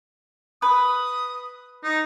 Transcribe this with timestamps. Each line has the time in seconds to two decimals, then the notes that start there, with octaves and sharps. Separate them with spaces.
0.62 B4 D#6
1.84 D#4